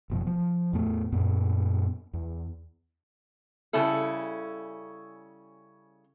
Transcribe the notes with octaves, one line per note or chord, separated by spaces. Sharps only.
F#1 B2 F3
F3
E2 A2 A3 B3
F#2 A#2 B3
E2
C#3 G3 C#4 E4 A4